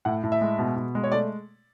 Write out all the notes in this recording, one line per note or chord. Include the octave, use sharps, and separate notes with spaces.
A2 F#5
A2
E5
G#3
B2
B2
G#3
C#5
A3 D5